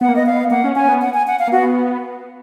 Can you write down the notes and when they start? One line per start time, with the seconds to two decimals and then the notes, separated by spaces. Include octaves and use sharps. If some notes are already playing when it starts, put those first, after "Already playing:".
0.01 B3 F#5
0.08 A#3
0.16 B3 D#5
0.26 F5
0.51 A#3 F#5
0.64 C#4
0.76 C#4 G#5
0.88 B3
1.02 F#5
1.14 G#5
1.27 F#5
1.39 F5
1.47 A#3
1.52 B3 F#4